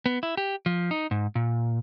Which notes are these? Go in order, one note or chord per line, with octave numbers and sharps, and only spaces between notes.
B3
E4
G4
F3
D#4
G#2
A#2